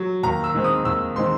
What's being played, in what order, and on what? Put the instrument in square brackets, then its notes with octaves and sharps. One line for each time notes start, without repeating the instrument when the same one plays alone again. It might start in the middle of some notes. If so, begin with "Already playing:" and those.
Already playing: [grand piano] F#3
D#2 A#5
E6
D#3 G#3 C4
D#6
D#2 E6
D#3 G#3 C4 C6